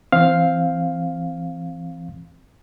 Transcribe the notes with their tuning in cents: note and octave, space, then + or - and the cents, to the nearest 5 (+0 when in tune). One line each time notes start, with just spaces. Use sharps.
E3 +20 C4 +0 F5 +0